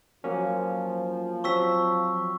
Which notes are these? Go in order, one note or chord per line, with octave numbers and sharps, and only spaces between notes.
F3 F#3 A#3 C#4
F#3 C4 C#6 E6 B6